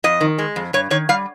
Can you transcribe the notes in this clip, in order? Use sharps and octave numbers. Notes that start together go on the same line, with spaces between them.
F2 D#5
D#3
G#3
F2
G2 C#5
D#3 C#5
G3 F5